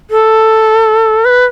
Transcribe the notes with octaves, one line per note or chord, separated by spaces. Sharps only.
A4
B4